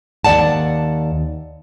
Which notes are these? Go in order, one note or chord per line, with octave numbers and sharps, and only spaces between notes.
D#2 E3 D5 F#5 A5